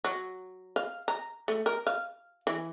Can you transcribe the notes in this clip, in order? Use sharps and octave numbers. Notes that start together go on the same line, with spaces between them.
F#3
F5
A#5
A3
A#4
F5
E3